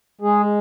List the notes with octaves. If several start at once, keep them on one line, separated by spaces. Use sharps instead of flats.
G#3 G#4